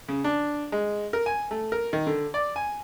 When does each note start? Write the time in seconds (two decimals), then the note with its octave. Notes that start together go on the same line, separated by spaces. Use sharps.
0.08 C#3
0.24 D4
0.72 G#3
1.13 A#4
1.26 G#5
1.51 A3
1.72 A#4
1.93 D#3
2.07 D3
2.34 D5
2.56 G#5